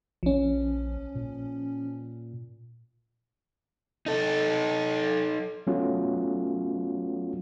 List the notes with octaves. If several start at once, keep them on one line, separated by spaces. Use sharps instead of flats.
A#1 F3 C#4
A#2
D#4 A4
F#3 A3 B3 C#4 F4 F#4